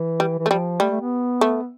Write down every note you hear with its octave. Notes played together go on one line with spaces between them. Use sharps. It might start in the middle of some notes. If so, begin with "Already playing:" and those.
Already playing: E3
G3
E3
A3
F3 G3
G3 A3
A3
B3
A3